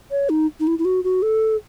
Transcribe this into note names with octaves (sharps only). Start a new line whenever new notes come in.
C#5
D#4
D#4
E4
E4
F#4
F#4
A4